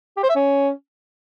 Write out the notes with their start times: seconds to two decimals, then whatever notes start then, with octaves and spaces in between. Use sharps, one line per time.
0.17 G4
0.23 C5
0.29 E5
0.35 C#4